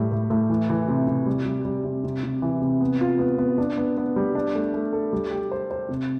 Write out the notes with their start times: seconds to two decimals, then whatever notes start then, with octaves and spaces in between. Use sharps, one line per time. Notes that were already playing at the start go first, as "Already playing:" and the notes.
Already playing: A2 G3
0.12 A2
0.30 A2
0.49 E3
0.70 E3
0.88 C3
1.08 C3
1.26 G3
1.46 G3
1.65 G3
1.84 C3
2.04 C3
2.23 C3
2.42 E3
2.61 C3
2.81 B3
3.01 F4
3.19 B3
3.38 B3
3.58 D4
3.77 B3
3.97 B3
4.16 G3
4.35 D4
4.55 A3
4.74 A3
4.93 A4
5.13 G3
5.31 G4
5.51 C5
5.71 C5
5.89 C3